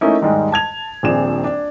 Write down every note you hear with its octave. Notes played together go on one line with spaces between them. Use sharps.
A3 A#3 C#4 D#4 E4
D#2 G#2 G3 G#3
A5 G#6 F7
D#1 A#1 C4 D4 G#4 E7
D4